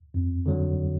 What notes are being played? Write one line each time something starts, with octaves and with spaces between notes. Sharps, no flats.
F2
D3 F#3